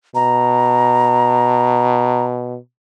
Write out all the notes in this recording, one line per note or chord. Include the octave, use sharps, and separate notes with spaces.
B2 A#5